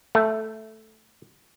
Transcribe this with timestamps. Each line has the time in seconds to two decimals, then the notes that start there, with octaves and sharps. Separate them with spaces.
0.15 A3